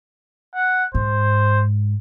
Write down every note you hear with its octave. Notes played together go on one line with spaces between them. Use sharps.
F#5
G#2 C5